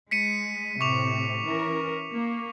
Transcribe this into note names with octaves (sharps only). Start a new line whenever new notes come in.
G#3 B6 C#7 D#7
A2 C3 C#6 D6 F7
E3 C#4 A#4
A#3